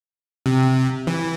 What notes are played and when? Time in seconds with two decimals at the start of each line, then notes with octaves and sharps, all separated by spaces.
0.46 C3
1.07 E3